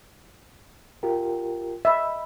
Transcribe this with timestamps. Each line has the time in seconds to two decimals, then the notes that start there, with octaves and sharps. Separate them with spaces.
1.03 F4 G4 A#4
1.85 D#5 E5 B5